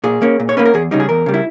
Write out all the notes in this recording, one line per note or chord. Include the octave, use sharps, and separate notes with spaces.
A#2 G#4
A#3 C#4
A#2
C#5
A#3 C#4 B4
A#4
E2 G#4
C#3 G3 D#4
G#4
E2 A#4
C#3 G3
E4